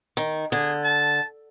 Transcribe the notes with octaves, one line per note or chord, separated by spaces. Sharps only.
D#3
D3 G#4
A5